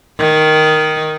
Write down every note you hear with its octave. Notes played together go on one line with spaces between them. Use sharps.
D#3